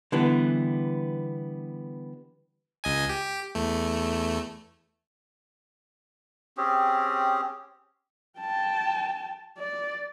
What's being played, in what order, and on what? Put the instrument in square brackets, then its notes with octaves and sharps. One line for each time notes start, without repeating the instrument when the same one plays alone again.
[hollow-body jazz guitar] D3 E3 G3 B3
[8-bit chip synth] C#2 D#5 G#5
G4
E2 A3
[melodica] C4 C#4 G4 G#4
[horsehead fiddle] G5 A5
D5